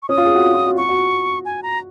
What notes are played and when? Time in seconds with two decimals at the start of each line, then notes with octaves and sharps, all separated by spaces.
0.03 C#6
0.09 C#4 D#6
0.18 F4
0.25 G#4
0.35 F#4
0.43 F4
0.54 F4
0.66 F#4
0.77 F#4 C#6
0.89 F#4
1.45 G#5
1.63 A#5